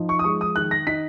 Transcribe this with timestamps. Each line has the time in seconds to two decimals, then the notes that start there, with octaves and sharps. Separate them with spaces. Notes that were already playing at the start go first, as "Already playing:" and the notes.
Already playing: F3 D#4
0.09 C#6
0.19 D#6
0.24 G#3 C#6
0.41 D#6
0.56 D#3 F#6
0.71 A#6
0.87 D#4 B6